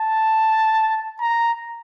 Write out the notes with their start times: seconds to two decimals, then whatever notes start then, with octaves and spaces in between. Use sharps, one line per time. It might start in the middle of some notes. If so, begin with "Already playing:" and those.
Already playing: A5
1.21 A#5